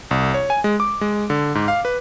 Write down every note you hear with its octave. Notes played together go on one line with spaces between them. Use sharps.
C2
C#5
G#5
G#3
D6
G#3
D3
G#2
F5
B4